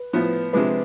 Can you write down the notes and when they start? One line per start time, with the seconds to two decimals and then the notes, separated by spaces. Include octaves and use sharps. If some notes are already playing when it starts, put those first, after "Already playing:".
Already playing: B4
0.13 A2 F3 B3
0.53 C3 F3 G#3 D4 B4